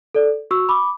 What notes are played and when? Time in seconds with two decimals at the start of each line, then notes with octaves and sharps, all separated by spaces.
0.14 A4 D5
0.51 F#4 C#6 E6
0.69 B5 D6